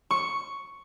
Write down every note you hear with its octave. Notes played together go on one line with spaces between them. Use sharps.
C#6